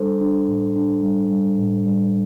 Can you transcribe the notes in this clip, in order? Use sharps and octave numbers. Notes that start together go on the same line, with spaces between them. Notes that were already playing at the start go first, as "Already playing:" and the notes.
Already playing: G3 D4 A4 C5
D4
A2
D4
G3
G3
A2
G3